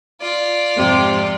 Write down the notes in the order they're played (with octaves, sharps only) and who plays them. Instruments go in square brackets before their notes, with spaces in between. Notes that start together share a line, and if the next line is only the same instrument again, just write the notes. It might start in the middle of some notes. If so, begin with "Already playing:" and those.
[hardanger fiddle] F4 D5
[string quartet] F2 G#2 C3